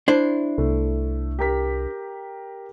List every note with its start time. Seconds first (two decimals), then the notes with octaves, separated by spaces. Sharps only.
0.08 D4 E4 C5
0.58 C2 A3
1.39 G4 A#4 B6